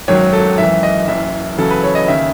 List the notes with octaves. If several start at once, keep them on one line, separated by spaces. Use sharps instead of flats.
G#1 F#2 D#3 F#3 C#5
A4
G#1 F#2 E3 E5
D#5
F#1 F#2 E3 E5
E2 C#3 F#3 A4
B4
C#5
D#5
D#2 C#3 E5